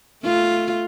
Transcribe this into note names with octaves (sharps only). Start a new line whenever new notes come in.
A3 F4